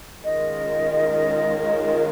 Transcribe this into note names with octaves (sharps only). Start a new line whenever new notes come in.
D#3 G#3 C#4 F4 A#4 D#5